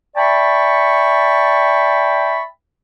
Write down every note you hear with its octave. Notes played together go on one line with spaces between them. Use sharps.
D5 E5 G5 A5 B5 C#6